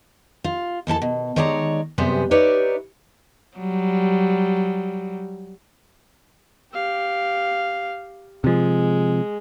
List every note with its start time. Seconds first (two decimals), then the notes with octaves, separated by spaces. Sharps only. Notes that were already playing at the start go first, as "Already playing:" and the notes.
0.44 F4
0.87 D#2 E3 A4 A5
1.02 B2
1.36 D#3 G#3 C#5 D5 A5 A#5
1.98 F#2 C3 G3 B3 G#4 C5
2.31 D#4 G4 B4 C#5 D5 E5
3.58 F#3 G3
6.73 G4 F5
8.44 C3 F3 G#3